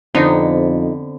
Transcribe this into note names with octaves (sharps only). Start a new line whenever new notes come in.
F2 D3 B3 C4 D#4